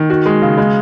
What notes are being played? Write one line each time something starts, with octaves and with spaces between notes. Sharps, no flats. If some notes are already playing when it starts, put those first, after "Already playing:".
Already playing: D#3
F#4
G#3
C#3
G#3